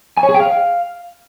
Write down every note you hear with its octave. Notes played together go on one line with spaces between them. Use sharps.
G#5
C#5
G#4
G5
F5